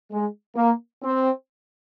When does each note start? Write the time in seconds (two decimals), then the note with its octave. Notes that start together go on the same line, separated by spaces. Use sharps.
0.11 G#3
0.56 A#3
1.02 C4